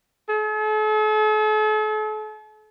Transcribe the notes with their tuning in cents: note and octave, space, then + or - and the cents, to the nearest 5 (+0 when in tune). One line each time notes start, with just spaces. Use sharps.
A4 -45